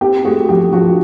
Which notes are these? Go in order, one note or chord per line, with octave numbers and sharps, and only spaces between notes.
C4 G4
A3 F#4 G#4
F3 G4
F3 F#4